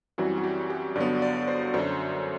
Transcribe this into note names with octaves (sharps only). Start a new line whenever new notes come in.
F#2 E3 G3 C4 F#4
F#4
G4
G4
G2 D3 F#3 B3 D5
D5
C5
F#2 D3 F#3 C5